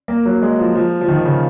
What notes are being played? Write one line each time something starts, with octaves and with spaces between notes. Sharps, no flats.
A#3
F#3
G#3
F3
F3
F3
D#3
C#3